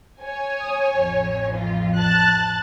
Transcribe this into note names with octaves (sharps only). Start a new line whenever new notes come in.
C#5 G#5
D#6
A1 F2
F4
A5 F#6 A6